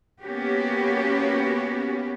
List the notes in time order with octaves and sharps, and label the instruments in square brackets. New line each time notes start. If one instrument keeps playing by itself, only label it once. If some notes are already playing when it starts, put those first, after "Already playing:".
[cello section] A#3 B3 C#4 F#4 G4